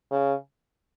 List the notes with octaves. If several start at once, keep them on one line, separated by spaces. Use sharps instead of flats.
C#3